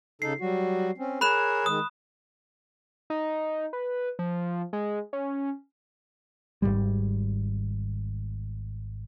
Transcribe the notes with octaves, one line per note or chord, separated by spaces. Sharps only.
C#3 D#4 A4 C7
F#3 G3 F#4
C4 C#4
G#4 A#4 C#5 B5 F#6 E7
D#3 G#3 D#6
D#4
B4
F3
G#3
C#4
G#1 D#2 G#2 G3